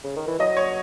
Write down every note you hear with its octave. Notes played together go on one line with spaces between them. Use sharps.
C#3
D#3
E3
F#3 D#5
C#5